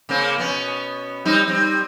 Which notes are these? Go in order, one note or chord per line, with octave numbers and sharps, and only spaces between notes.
C#3 A#3 C4
B2 B3 C#4
G3 C4 D#4
G3 C4